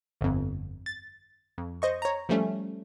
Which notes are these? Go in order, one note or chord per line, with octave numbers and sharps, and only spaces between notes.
G1 F2
A6
F2
C5 D#5 C#6
C#5 A#5
F3 G3 A3 C#4